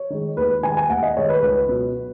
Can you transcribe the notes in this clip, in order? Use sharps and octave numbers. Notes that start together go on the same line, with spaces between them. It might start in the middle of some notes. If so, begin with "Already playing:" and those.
Already playing: C#5
D#3 G#3
D#2 B4
D#3 G#3 G#5
G#5
D#2 F#5
D#5
D#3 G#3 C#5
B4
C#2 B4
B2 F#3